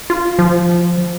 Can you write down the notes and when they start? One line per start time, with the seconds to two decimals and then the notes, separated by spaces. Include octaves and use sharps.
0.10 F4
0.39 F3